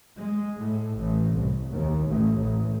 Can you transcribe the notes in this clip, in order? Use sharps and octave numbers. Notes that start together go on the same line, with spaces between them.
G#3
A2
A1
C2
D#2
A1
A1